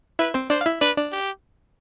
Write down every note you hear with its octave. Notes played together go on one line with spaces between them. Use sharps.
E4 B4 E5
C4 C5
D4 C5 D5
F5
E4 E5
D4 B4 D5
D4 D5
G4